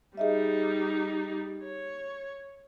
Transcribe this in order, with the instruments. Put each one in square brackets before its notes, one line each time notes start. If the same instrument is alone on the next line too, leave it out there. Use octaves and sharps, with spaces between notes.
[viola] G3 D#4 [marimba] G#4 D#5 E5
[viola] C#5